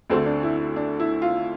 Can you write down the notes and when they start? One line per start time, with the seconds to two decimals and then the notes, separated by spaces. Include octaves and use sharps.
0.10 D2 D3 A3 C4
0.26 D4
0.43 E4
0.76 D4
1.00 E4
1.22 F4